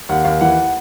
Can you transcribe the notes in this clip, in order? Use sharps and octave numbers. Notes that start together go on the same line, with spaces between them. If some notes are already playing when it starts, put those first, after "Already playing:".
D#2 F#5
D#2 F5
E3 F#5